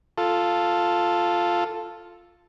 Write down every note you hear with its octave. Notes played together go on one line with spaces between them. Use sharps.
F4 A4